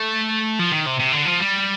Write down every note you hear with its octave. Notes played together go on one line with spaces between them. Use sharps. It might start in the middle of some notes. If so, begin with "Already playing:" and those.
Already playing: A3
F3
D#3
C3
C3
D3
F3
G3